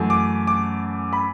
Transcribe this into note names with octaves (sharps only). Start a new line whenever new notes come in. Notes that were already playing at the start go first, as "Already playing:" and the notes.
Already playing: F#2 E3 A3
D6
D6
B5